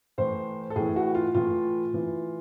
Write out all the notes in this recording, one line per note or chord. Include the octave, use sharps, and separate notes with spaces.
A2 E3 C5
A4
A2 E3 G#4
F#4
F4
A2 E3 F4
A2 E3